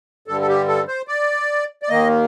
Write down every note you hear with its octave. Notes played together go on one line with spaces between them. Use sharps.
G2 D3 G3 A4
A4
G4
A4
C5
D5
D5
D#2 D#3 A#3 D#5